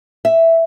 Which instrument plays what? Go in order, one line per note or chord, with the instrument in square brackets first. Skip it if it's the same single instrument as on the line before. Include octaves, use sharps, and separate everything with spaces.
[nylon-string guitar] E5